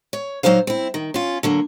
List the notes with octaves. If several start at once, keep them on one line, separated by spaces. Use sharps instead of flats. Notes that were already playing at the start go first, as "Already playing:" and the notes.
C#5
A#2 F#3 G#3 D#4 C5 F5
C4 E4
D#3
C#4 F4
D3 F#3 A#3